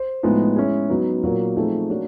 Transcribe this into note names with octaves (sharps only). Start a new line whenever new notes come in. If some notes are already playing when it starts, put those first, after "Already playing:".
Already playing: C5
A2 F3 G#3 B3 D#4
G#3 C#4 E4 G#4
F#3 B3 D#4
A#2 F#3 A#3
F3 A3 C4 D#4 G#4
A#3 D4 F#4 A#4 C#5